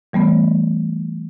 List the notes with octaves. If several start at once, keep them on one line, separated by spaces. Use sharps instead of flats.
E3 G3 A3 B3